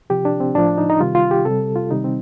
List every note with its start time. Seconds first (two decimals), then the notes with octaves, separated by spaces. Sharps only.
0.10 C3 F3 G4
0.25 D4
0.40 C4
0.55 A2 F3 D4
0.78 D#4
0.90 D#4
1.00 C3 D#3 G3 F4
1.15 F4
1.31 G4
1.45 C3 G3 A4
1.75 F4
1.91 C3 D#3 G3 D#4
2.04 C4